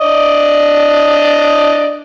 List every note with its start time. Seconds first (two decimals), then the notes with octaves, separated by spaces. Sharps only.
0.01 D4 D5 D#5